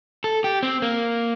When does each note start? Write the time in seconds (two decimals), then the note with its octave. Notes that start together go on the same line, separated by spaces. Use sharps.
0.24 A4
0.44 G4
0.63 C4
0.82 A#3